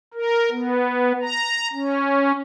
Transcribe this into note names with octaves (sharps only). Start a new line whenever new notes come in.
A#4
B3
A#5
C#4